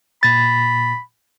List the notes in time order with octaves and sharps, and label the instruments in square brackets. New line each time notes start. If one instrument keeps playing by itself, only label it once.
[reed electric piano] A#2 A6 [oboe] B5